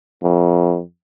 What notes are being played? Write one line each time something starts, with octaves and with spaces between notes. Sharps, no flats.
F2